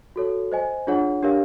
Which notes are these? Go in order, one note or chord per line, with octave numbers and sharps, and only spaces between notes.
F#4 A4 C#5
C5 D#5 G#5
D4 F4 G#4 C#5 F#5
D4 G4 A#4 C#5 F5